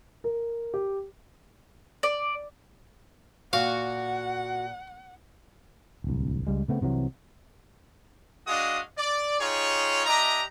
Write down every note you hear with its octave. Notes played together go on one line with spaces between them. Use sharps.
A#4
G4
D5
A#2 F#4 F5 F#5
D1 C2
C#2 G3 G#3
C#3 A3 B3 C4
C2 C3 E3 F#3
G#3 D4 F#4 D#5 F5 D#6
D5
D#4 F4 G4 G#4 C#5
D4 G4 D#5 E5 A#5